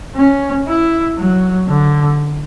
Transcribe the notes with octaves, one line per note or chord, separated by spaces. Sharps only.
C#4
E4
F#3
D3